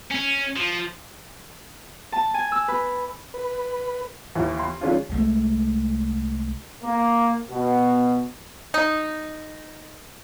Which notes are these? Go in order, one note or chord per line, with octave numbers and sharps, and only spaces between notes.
C#4
F3
A5
G#5
E6
B4
B4
D#2 E3
C6
D#3 G#3 C#4 D4 F4
C2 G#3 A3
A#3
B2
D#4